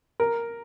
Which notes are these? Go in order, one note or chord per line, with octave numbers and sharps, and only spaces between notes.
A#4